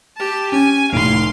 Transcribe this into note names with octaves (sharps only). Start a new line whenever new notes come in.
G4 A5
C#4 G#5
F1 A2 F5 C6 D7